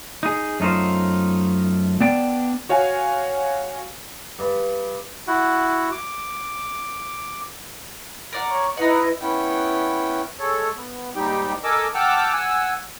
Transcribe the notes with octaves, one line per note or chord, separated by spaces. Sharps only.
D#4 G#4
F#2 A3 D#4 F4 C5
B3 D4 D5 G5
F#4 C#5 F5 G#5
G2
E4 F#4 F#5
D6
A#4 D5 F#5
C#5 C#6
D#4 E4 B4 D#5 F#5
B3 C#4 E4 G5
G#3 A4 C#5
B3
D#2 G#2 G3 D#4 G4 G5
A4 A#4 D#5 G#5 D6 E6
F#5 G5 A5 D6 E6 F6
F#5 G#5 E6